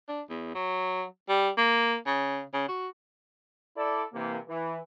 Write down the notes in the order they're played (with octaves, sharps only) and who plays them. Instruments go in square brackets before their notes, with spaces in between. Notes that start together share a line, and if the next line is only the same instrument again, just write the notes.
[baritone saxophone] D4
E2
F#3
G3
A#3
C#3
C#3
F#4
[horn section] E4 A4 D5
C3 E3 A#3
E3